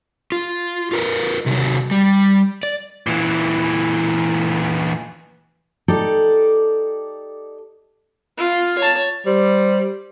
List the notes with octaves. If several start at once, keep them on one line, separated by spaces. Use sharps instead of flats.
F4
F4 A#4 B4
C3 D#3 F#3
G3
D5
A#2 E3
D#4 G4 A4 D5
F4
C#5 A5
G3 C5